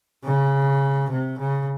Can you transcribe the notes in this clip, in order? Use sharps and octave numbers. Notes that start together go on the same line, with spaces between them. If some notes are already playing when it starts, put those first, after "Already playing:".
C#3
C3
C#3